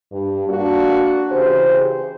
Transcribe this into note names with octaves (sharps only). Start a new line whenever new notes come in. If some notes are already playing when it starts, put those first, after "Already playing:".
G2
A#3 D4 F#4
C#3 E3 G4 G#4 C5